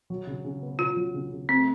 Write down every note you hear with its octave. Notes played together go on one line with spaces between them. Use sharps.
F#3
C#3
C#3
B3
C#3 F4
F#3
C#3
C#3
A3 C4